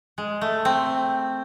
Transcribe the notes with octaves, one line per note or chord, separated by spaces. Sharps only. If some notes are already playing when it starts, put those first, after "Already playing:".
G#3
A3
C4